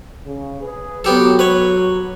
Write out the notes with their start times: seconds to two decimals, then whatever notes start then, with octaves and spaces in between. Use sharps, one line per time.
0.25 C#3
0.62 G#4 B4
1.04 F#3 B3 G4 A4
1.39 B4 C#5